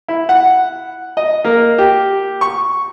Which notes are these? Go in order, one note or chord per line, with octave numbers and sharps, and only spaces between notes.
E4
F#5
D#5
A#3
G4
C#6